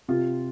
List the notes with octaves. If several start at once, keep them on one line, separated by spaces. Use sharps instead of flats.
C3 F4